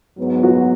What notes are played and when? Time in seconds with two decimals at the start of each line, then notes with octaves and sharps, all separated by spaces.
0.17 G#2 F#3 B3
0.43 F#4